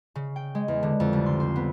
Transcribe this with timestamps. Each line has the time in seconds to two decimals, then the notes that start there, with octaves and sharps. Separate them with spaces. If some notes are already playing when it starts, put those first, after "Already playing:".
0.15 C#3
0.36 G5
0.55 G#3
0.68 E2
0.83 D3
1.00 F2
1.13 C2
1.26 C6
1.40 C5
1.56 B3